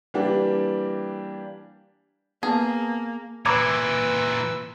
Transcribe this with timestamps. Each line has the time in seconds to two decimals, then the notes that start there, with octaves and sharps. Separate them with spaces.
0.14 E3 G3 A#3 D4 G4
2.43 A#3 B3 G#4 A5
3.46 A#2 E3 B4 A#5 B5 D6 E6 G#6